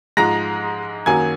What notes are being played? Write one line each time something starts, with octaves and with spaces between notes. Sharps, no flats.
G#2 F3 G#3 A#5 A#6
F#2 D#3 F#3 A#3 G#5 G#6